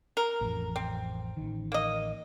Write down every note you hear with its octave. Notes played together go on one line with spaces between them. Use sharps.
A#4
A1 F2
C4
A1 D#3
A#3 D#5